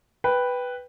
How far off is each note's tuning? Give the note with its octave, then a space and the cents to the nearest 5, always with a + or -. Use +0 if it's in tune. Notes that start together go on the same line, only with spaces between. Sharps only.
B4 +0 G5 +5